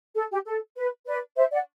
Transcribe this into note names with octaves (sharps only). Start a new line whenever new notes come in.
A4
G4
A4
B4
B4 D5
C5 E5
D5 F#5